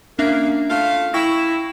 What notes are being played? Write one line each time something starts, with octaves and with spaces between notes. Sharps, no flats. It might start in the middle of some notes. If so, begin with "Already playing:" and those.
A#3 C#4 D4 E5
A3 F4 F5
E4 G5 C#6 A#6